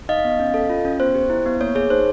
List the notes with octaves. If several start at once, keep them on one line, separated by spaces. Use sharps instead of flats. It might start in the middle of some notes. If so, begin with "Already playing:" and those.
D#4 D#5 F5
B3
C#4
A4
F4
C#4
B3 C5
G4
E4
B3
A#3 C#5
G#4 C#5
D#4 C5